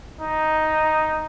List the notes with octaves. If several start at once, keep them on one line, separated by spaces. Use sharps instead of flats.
D#4